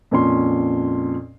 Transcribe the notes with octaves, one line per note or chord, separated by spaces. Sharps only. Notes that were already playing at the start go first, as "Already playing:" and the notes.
F2 A#2 C#4 C6